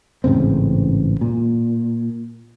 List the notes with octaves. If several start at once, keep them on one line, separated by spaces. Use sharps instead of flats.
A1 G#2 C#3 C4
A#2